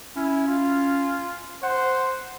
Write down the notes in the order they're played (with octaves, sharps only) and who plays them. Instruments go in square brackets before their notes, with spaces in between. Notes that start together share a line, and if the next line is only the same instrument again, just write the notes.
[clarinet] C#4 [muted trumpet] E4
[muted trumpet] F4
[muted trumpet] C5 [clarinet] F#5